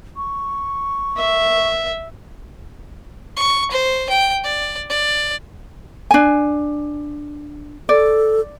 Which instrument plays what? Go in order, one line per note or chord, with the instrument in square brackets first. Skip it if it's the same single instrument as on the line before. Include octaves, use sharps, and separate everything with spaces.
[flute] C#6
[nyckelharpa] E5
[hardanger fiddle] C#6
C5
G5
D5
D5
[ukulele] D4 G#5
[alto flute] A4 [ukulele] D5